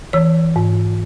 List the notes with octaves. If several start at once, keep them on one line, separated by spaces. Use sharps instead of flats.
E3 C#5
G#2